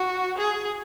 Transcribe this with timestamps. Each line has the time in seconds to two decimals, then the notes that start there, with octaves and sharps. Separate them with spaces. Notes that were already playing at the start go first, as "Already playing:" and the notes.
Already playing: F#4
0.38 G#4